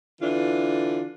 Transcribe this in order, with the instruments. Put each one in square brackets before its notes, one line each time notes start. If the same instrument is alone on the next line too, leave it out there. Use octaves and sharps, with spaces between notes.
[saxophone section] D3 E3 D4 F4